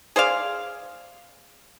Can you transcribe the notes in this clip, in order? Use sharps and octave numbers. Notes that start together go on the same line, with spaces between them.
G#4 C5 D5 F5